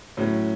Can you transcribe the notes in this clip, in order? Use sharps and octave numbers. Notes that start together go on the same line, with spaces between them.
A2 F#3 C#4